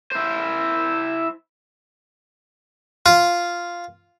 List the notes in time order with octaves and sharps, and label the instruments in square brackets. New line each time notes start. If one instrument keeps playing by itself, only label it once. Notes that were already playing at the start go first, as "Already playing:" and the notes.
[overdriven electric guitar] E4 C5
[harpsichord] F4